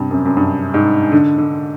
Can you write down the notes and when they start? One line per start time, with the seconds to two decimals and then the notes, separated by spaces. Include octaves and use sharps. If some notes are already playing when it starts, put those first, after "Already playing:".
Already playing: G2 C3
0.11 F#2
0.25 F#2
0.37 G2
0.74 G#2
1.12 D3
1.38 D3